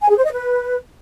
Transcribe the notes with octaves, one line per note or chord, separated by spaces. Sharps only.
G#5
G#4
C5
D#5
B4